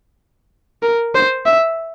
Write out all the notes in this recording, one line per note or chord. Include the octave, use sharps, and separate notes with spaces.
A#4
C5
E5